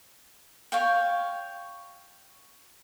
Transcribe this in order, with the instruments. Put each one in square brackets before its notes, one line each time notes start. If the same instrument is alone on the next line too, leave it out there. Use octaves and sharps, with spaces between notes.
[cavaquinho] C#5 F5 G5